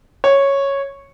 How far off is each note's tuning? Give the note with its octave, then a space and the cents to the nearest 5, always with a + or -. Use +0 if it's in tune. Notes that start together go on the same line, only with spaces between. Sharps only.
C#5 -5